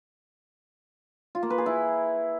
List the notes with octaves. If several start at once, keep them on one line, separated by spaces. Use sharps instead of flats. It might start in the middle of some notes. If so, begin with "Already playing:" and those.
F4
A#3
B4
G#4
E4